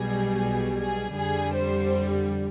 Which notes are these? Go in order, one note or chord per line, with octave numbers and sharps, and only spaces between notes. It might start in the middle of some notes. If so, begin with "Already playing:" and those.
Already playing: B1 B2 G3 G#4
G#4
F2 D3 G3 G#4
C5